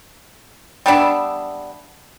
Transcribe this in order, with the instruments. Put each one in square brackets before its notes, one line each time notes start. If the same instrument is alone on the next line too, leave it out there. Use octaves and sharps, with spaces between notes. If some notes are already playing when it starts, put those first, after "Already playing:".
[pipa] G3 B3 D4 E5